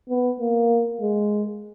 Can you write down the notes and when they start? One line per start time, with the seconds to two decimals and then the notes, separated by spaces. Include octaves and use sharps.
0.10 B3
0.40 A#3
1.01 G#3